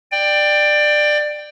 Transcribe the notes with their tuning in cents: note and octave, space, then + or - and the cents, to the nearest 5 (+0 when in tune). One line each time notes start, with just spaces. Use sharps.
D5 +20 G5 +10